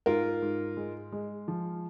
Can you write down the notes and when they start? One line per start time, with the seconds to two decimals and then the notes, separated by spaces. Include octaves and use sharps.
0.06 G#2 F4 A#4
0.42 G#2
0.77 G#3
1.12 G#3
1.48 F3